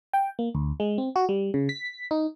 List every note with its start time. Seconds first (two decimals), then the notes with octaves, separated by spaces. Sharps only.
0.13 G5
0.39 A#3
0.55 D2
0.80 G#3
0.98 C4
1.16 F#4
1.29 G3
1.54 C#3
1.69 B6
2.11 D#4